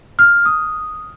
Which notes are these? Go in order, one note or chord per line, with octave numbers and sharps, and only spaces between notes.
F6
D#6